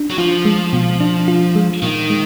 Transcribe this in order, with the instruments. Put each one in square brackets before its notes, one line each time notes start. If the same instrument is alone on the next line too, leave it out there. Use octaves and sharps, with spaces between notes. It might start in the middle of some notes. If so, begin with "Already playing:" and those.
Already playing: [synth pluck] D4
[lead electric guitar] F#3
[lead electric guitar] F3 [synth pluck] F4
[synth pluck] G#3
B2
D4
F4
G#3
[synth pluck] A#2 [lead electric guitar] D#3
[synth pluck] G#3